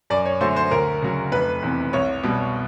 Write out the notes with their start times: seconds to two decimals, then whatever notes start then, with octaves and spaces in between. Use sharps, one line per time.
0.10 F#2 D5
0.26 C#5
0.41 D3 F#3 A3 C5
0.56 C5
0.71 D2 A#4
1.02 C#3 F#3
1.32 F1 B4
1.63 E2 C3
1.93 C2 C#5
2.23 B2 G3